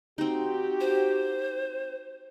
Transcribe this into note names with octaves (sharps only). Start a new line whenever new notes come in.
C4 D#4 F#4 G4
C5